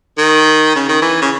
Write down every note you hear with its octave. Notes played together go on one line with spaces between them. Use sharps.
D#3
C#3
D#3
E3
C#3